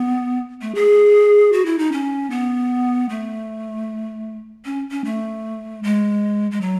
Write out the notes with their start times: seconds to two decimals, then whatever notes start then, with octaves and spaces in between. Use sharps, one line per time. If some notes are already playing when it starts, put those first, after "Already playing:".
Already playing: B3
0.62 A3
0.75 G#4
1.53 F#4
1.66 E4
1.79 D#4
1.92 C#4
2.30 B3
3.09 A3
4.65 C#4
4.91 C#4
5.05 A3
5.83 G#3
6.51 G#3
6.61 F#3